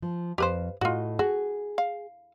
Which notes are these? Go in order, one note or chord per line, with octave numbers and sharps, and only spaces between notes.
F3
F2 G4 B4 C5 F5
A2 F4 F#4 D#5
F#4 G#4
F5